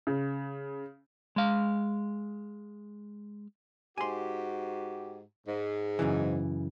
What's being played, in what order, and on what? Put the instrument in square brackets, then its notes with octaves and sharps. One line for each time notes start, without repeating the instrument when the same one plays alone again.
[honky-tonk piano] C#3
[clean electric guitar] G#3 F5
[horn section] G#2 F#4 G4 [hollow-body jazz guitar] G#5 C6
[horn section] G#2
[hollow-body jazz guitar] F#2 C#3 E3